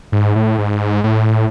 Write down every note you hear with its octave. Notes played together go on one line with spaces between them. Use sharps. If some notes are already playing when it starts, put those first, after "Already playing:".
G#2
A2
G#2
A2